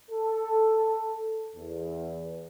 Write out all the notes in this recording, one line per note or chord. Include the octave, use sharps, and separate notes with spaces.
A4
E2